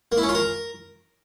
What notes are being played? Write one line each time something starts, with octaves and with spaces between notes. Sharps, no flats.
A#3
E4
C#4
F4
A#4